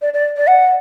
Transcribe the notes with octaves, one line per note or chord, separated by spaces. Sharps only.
D5
D5
D5
F#5